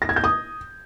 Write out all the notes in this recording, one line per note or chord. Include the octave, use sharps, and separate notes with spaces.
A#6
G#6
G6
D#6